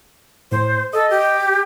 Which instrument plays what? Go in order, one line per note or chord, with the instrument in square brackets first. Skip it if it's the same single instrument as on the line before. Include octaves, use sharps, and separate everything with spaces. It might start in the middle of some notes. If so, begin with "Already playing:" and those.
[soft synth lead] A2 [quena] C5
[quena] A4 [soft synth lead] D#5
[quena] G4